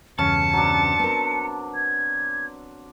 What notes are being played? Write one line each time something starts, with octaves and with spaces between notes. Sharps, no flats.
E2 G2 C#3 C#4 A5 C#7
F#3 C4 D4
B3 A#4
G#6